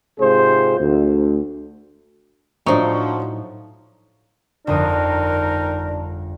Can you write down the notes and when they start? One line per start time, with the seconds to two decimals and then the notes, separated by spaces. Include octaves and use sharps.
0.19 G#2 C3 F4 G#4 C5
0.80 D2
2.66 A2 F3 F#3 D4 D#4 C5 C#6
4.67 G1 F2 C4 D4 D#4 A#4 D#6